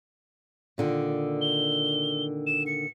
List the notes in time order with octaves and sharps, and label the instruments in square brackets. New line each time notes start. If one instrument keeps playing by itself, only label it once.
[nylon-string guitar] A#2 D3 D#3
[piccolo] G7
E7
C#7